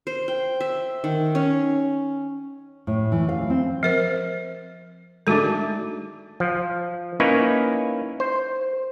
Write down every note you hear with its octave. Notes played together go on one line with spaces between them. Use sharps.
C5
G5
E5
D#3
C#4
A2
E3
F5
C4
F3 A#4 C5
G#3 A3 D4 D#4 F#4 A4
F3
A#3 C#4 D#4 E4 B4 C#5
C5